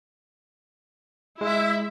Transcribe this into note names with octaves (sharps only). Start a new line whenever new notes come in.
G#3 E4 E5